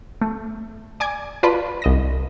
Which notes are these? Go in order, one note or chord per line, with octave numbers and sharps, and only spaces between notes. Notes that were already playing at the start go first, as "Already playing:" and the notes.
A3
D5 G#5 D6 G#6
F4 B4 D5 A5 B5 C6
C2 D#5 A#6